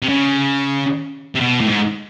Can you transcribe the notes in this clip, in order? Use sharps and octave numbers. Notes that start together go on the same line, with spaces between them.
C3
C#3
C3
B2
A2
G#2